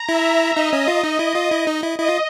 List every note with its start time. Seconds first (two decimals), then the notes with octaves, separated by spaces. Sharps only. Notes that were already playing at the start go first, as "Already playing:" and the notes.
Already playing: A#5
0.09 E4 E5
0.56 D#4 D#5
0.73 C#4
0.88 F4
1.03 D#4
1.19 E4
1.35 F4
1.51 E4
1.67 D#4
1.83 E4
1.98 E4 D#5
2.08 F4